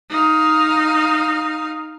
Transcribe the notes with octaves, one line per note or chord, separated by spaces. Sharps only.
D#4 F5